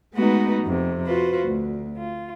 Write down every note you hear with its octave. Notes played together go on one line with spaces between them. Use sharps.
G#3 A3 B3 D#4 F#4 B4
F2 C3
F4 F#4 B4 C5
D2
F4